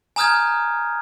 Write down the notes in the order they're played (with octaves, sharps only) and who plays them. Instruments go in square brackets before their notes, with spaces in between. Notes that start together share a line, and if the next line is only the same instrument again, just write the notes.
[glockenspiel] G#5 A#5 D#6 F6 G6 G#6